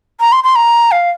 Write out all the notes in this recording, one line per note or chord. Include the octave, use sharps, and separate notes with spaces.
A#5
C6
C6
A#5
F5